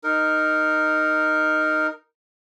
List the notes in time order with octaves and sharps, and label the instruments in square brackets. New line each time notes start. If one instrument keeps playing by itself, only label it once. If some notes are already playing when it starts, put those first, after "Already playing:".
[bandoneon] D#4 A#4